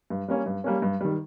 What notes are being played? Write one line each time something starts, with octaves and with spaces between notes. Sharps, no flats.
G2
G3 A#3 C#4
G2
G3 A#3 C#4
G2
D#3 G3